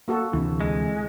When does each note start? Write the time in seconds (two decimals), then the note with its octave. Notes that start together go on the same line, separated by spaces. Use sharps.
0.08 A#3 F#4 A4
0.33 D2 C3 E3 D4
0.60 G#3